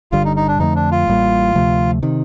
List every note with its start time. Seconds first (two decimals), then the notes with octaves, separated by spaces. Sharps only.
0.12 G1 G2 D3 G3 F4
0.25 D#4
0.36 D#4
0.48 D4
0.59 F2 D3 F3 A3 D#4
0.76 D4
0.92 F4
1.07 A1 A2 G3 A#3
1.55 D2 C3 F3 A3
2.03 C3 D#3